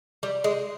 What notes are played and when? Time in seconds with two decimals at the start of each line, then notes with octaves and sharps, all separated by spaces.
0.23 G3
0.44 G#3